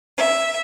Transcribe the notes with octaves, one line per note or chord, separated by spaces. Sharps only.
E5